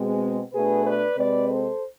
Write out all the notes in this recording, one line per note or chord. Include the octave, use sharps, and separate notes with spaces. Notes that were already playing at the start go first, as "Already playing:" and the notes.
Already playing: B2 G#3 C4
B2 A3 D4 G#4 B4
B4 D5
C3 G#3 C4 B4 D5
A4 C5